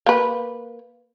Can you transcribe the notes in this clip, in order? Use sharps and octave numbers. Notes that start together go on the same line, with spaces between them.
A#3 B4